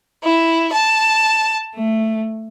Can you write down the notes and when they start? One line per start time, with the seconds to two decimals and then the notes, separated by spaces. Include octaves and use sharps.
0.23 E4
0.72 A5
1.75 A3